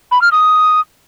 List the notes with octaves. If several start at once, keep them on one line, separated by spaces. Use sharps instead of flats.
B5
F6
D#6